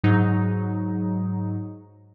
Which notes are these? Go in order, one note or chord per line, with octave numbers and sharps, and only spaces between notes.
G#2 F#3 D#4